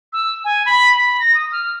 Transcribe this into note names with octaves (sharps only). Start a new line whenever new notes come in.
E6
G#5
B5
B5
A#6
D#6
F6